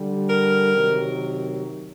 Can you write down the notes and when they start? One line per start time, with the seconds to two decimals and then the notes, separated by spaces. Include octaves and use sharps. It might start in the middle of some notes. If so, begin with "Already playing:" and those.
Already playing: D3 G3
0.30 A#4
0.75 C3 D#3 F#3